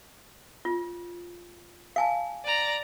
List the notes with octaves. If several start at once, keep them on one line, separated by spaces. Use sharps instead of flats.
F4
F5 G#5 A5
D5 A#5